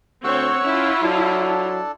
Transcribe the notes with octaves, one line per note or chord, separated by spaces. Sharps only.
D2 C4 C#5 F#5 C#6 E6
C#4 E4 F4
F#3 D4 A4